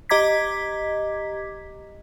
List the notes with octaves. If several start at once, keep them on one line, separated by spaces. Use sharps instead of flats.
G4 D#5 A#5 D6 G#6 B6